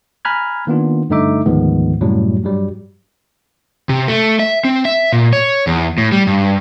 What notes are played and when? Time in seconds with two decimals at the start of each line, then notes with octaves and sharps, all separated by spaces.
0.25 G#5 A#5 B5 F6 F#6 G#6
0.67 D#3 A#3 B3 D4 F4
1.10 G2 D3 A3 D#4 E5 D6
1.46 D2 G#2 D#3 F3 G#3 B3
2.01 F#2 A2 C3 F#3 G3
2.43 G2 F#3 G3
3.89 C3
4.08 A3
4.39 E5
4.65 C4
4.85 E5
5.13 A#2
5.33 C#5
5.67 E2
5.98 A2
6.12 G3
6.27 G2